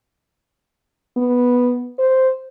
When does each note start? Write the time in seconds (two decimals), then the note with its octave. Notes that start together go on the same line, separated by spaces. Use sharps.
1.17 B3
1.99 C5